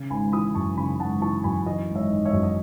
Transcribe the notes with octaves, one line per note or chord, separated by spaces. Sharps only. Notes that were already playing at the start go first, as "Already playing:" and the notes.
Already playing: C#3
G#1 G#5 B5
E3 B5 D#6
F#2 A5 C#6
C#3 G#5 B5
G#1 F#5 A5
E3 A5 C#6
F#2 G#5 B5
E3 D#5
G#1
C#5 E5
G#1
C#5 E5
F#2
D#5